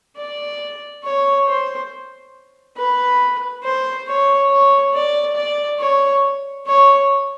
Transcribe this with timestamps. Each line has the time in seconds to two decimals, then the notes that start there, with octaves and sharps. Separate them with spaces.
0.17 D5
1.04 C#5
1.47 C5
2.77 B4
3.63 C5
4.07 C#5
4.50 C#5
4.94 D5
5.36 D5
5.79 C#5
6.67 C#5